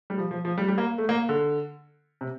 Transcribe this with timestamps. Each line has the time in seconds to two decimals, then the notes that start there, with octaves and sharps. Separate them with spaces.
0.10 G3
0.18 F3
0.31 F3
0.45 F3
0.58 G3
0.68 G3
0.78 A#3
0.98 A3
1.09 A#3
1.29 D3
2.21 C3